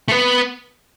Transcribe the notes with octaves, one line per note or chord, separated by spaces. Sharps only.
A3
B3